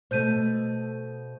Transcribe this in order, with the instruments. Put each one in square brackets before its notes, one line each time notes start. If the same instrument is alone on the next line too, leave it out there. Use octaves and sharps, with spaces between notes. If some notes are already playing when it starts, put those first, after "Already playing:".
[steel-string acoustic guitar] B2 A3 [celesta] C5 G6 D#7